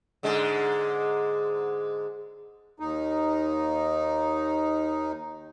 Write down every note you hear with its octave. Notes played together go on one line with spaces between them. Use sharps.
G#2 D3 G#3
D#2 D#4